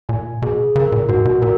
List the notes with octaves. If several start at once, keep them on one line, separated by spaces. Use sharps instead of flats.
A#2 G#5
B2 G#4
C#3 A#4
A#2
G#2 F#4
B2
A#2 A#4